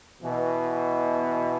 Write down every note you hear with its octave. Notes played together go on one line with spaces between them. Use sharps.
B2 E3